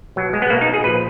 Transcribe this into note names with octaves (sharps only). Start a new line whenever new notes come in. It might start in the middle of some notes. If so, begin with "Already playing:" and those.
B2 F#3
G#3
B3
B2 A#3
D#4
G#4
A#2 F3 B4